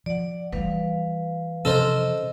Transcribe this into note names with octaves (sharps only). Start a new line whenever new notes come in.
F3 D5 F#5
E3 G3 B4 F5
C3 F3 C#4 A4 A#4 C5 D#5